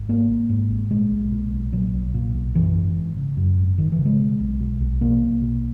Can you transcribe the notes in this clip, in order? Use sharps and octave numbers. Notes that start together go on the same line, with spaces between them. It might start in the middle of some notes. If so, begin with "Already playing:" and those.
Already playing: G#1
G#2 A#3
G#1
G#2
G#1
A#2 G#3
B1
A#2
B1
A#2 F#3
B1
A#2
B1
F#2 E3
G#1
G#1
C#3
F#2
G#1
G#1 D#3
E3
C#3
G#3
B2
B1
B2
B1
B2 A#3
B1
B2